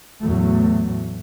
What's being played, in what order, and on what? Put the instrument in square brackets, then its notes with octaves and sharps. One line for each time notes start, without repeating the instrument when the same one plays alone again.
[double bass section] E2 A2 F#3 A3